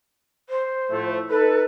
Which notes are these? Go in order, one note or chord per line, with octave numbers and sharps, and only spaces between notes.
C5
A2 F3 A3
D#4 A4 B4